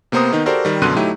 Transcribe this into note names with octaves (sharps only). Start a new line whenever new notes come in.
C3 A#3 B3 C5 A#5 D#6
D#3 B3 D#4
F#4 G4 A4 A#4 C5 D5
D#3 G3
F#2 B2 D3 C6 F#6 D#7
F#3 A3 D#4 E4 G4